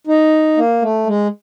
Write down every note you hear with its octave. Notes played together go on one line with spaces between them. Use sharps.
D#4
A#3
A3
G#3